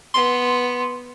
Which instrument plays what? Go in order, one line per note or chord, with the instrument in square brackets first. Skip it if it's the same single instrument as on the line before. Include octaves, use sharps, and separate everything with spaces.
[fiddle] B3 [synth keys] C6